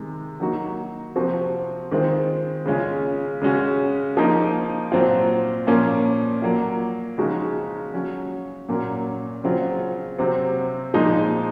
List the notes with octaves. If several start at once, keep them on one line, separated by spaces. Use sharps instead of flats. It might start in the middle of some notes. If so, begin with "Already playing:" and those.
Already playing: C3 D#3 G#3
F#3 A#3 D#4 F#4
C3 F3 C4 F#4
D#3 G#3 C4 F4
C#3 G#3 C#4 F4
C#3 G#3 C#4 F#4
F3 A#3 D#4
A#2 F#3 C4 F4
A#2 F3 A#3 C#4
F#3 A#3 F4
C#3 F3 G#3 D#4 F#4
F#3 C#4 F#4
A#2 F#3 A#3 C#4
C#3 F#3 C4 F4
C3 F#3 C4
A#2 F3 G#3 D#4